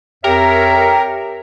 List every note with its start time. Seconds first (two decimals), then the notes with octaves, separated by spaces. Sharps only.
0.24 F2 G4 A#4 C#5 E5